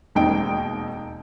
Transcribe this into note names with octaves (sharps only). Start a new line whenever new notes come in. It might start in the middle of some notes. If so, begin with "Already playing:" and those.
E1 D#2 C4 D#4 G5 D7